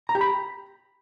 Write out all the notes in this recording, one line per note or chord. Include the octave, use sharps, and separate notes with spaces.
A#5
G4
B5